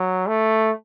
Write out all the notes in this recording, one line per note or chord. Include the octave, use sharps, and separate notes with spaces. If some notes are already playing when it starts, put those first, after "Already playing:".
Already playing: F#3
A3